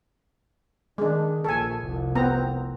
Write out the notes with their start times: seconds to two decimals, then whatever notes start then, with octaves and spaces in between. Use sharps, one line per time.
0.98 D#3 G#3 D4
1.44 A#1 A4 G#5
1.81 F1 C2
2.15 B3 C4 A#5